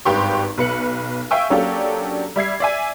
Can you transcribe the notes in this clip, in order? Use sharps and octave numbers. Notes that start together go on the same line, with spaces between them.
G#1 G2 G4 B4 C6 C#6
B1 B4 C#7 F#7
E5 F5 G5 G#5 C#6 E6
F#3 A#3 C#4 D4 G4 A4
G3 E5 G#6 C7
D5 E5 G#5